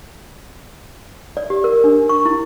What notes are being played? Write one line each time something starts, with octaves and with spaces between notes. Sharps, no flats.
D5
G4
A#4
D4
C#6
E4